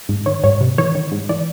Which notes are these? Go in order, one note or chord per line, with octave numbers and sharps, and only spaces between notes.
G#2
D#3 C#5
G#2 C#5
C3
E3 C#5
D#3
G#2
E3 D5